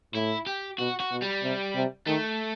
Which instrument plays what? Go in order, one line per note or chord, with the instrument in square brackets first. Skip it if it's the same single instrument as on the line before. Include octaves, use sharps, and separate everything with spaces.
[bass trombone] A2 [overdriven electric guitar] E4
[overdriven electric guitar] G4
[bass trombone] B2 [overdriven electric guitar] F#4
[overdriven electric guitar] F#4
[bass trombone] B2
[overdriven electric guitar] G3
[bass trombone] C3
C3
[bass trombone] D#3 [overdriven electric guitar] A3